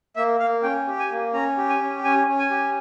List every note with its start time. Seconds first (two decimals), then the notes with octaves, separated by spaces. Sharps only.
0.16 A#3 E5
0.40 A#3 F5
0.63 C#4 G5
0.87 G4
0.99 G#5
1.11 A#3
1.33 C#4 A#5
1.57 G4
1.69 G#5
1.80 C#4
2.04 C#4 G#5
2.27 C#4
2.39 G#5
2.50 G4